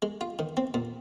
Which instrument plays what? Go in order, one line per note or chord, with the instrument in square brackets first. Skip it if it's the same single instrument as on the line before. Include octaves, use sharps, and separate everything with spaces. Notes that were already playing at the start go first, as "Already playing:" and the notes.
[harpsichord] G#3
F4
D#3
C4
A#2